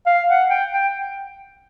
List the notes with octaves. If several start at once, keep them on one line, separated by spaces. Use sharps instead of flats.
F5
F#5
G5
G5